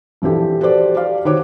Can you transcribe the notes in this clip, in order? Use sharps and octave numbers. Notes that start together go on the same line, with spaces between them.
A#1 E3 F3 G4 A4
F#4 G4 A4 C5 D5
G4 D5 F5
D#3 F#4 C5 C#5 D6